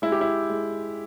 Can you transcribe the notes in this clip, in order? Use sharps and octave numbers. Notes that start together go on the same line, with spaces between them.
G#3 E4
G4
E4
G#3